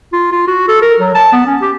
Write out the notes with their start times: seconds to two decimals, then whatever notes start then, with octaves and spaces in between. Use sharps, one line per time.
0.13 F4
0.32 F4
0.47 F#4
0.68 A4
0.82 A#4
1.00 F#3
1.15 A5
1.33 B3
1.47 C#4
1.62 G4